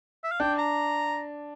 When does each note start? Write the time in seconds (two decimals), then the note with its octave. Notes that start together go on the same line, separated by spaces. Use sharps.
0.24 E5
0.32 F5
0.40 D4 G5
0.58 A#5